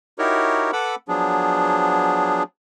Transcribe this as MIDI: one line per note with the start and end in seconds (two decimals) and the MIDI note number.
0.19 0.71 63
0.19 0.71 64
0.19 0.71 66
0.19 0.71 67
0.19 0.71 70
0.19 0.71 73
0.73 0.95 69
0.73 0.95 71
0.73 0.95 78
0.73 0.95 83
0.73 0.95 86
0.73 0.95 88
1.08 2.43 53
1.08 2.43 54
1.08 2.43 59
1.08 2.43 62
1.08 2.43 68